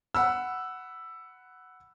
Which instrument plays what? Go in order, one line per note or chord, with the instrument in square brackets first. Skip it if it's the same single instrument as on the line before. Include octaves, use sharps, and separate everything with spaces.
[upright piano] F#5 B5 E6